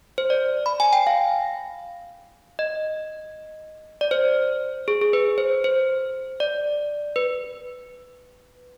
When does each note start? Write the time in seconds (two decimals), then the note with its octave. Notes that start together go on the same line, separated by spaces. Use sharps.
0.18 C5
0.30 D5
0.66 B5
0.80 G#5
0.93 G5
1.07 F5
2.59 D#5
4.01 D5
4.11 C5
4.88 G#4
5.01 G#4
5.13 B4
5.38 C5
5.64 C5
6.40 D5
7.16 B4